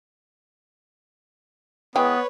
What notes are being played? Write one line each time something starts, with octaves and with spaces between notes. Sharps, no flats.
E3 G#3 B3 B4 C#5 G5 D#6